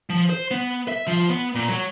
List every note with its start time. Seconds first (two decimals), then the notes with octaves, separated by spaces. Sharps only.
0.10 F3
0.30 C5
0.51 B3
0.88 E5
1.07 F3
1.29 B3
1.55 A#2
1.69 F#3